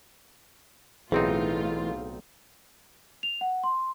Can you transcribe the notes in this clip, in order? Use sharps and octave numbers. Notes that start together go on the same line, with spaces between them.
B1 A2 E3 C4 D#4 F4 G#4
F7
F#5
C6